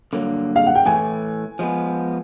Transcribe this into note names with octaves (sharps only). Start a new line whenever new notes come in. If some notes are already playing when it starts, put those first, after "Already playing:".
G2 D3 F#3 A#3
F5
F#5
G5
A2 E3 A3 G#5
F3 G#3 B3